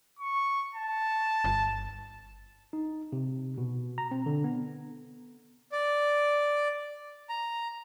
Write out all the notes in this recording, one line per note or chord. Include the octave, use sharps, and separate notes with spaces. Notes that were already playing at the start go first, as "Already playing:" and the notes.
C#6
A5
G1
D#4
C3
B2
A#5
C4
D3
B3
D5
A#5